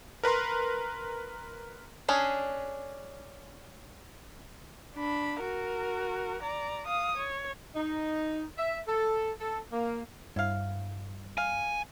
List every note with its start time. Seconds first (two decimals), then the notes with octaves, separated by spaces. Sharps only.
0.23 A#4 B4 A#5 C6
2.08 C#4 D4 G#4
4.96 D4 B5
5.41 F#4 A#4
6.43 D5 A#5
6.87 F5 D#6
7.17 C#5
7.76 D#4
8.57 E5
8.87 A4
9.40 A4
9.71 A#3
10.36 G2 E4 F5
11.38 F5 G#5